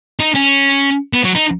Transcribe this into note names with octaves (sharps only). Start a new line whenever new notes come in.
D#4
C#4
B3
F#3
D#4